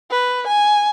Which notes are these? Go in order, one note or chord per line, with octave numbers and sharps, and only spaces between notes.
B4
G#5